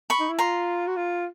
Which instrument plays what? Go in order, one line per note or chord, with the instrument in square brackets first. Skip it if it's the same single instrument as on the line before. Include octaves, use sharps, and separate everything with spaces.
[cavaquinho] B5 C#6
[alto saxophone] D#4
E4
[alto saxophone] F4 [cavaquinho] A#5 C6
[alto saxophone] F#4
F4